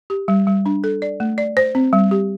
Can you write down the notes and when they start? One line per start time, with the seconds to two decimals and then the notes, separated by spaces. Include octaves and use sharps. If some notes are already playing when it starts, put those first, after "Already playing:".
0.10 G4
0.28 G3
0.47 G3
0.66 D4
0.84 A4
1.02 D5
1.20 A3
1.38 D5
1.57 C5
1.75 C4
1.93 G3
2.11 G4